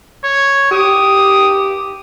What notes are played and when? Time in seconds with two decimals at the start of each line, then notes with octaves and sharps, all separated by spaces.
0.25 C#5
0.71 G4 D#6